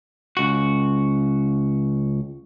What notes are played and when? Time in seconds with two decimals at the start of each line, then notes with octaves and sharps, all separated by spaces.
0.37 C#2 F#4